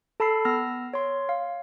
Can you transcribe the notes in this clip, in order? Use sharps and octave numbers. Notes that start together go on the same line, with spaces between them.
A4 A5 B5 E6 C7
B3 E6 F6 A#6
C#5 C6
F5